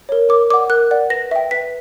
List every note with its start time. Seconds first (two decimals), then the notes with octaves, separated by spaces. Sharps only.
0.09 A#4 C#5
0.29 A#4 D6
0.50 D5 D6
0.54 F#5
0.70 A#4 F#6
0.91 D5 F#5
1.10 B4 A#6
1.31 E5 G5
1.51 B4 B6